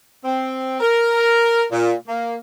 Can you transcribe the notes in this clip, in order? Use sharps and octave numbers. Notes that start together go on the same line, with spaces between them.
C4
A#4
A#2
A#3